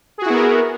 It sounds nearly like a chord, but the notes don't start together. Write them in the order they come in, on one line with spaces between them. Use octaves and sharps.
G#4 F#4 E4 B3 A#4